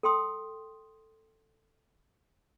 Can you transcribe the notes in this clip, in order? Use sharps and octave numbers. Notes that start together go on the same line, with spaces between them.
A4 G5 C6 D#6